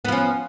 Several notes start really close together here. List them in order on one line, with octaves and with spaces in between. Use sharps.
B3 F3 C#4